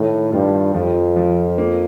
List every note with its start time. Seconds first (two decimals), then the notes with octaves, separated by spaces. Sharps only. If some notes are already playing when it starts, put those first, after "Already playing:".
Already playing: A2 D#3
0.32 G2 F4
0.74 F2 F3
1.16 F3
1.58 A#3